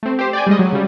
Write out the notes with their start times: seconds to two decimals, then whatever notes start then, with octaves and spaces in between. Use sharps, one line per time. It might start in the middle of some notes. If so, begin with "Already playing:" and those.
0.03 A3 C4
0.19 G4 C5
0.33 D5 G5 G#5
0.47 G3 G#3 D#5
0.59 F#3
0.73 C#3 G3